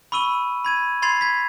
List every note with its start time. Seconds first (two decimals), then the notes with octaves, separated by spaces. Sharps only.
0.12 B5 C#6 E6 D#7 G7
0.65 B5 G#6 D#7
1.02 B5 C6 G#6 A6 C7 F7
1.21 G#6 B6